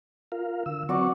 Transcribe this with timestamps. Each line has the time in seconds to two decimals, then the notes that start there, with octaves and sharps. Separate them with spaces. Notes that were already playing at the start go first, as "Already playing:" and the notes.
0.32 F4 A#4 F5
0.66 D3 E6
0.89 F#3 C4 F#4 B4 D5 C#6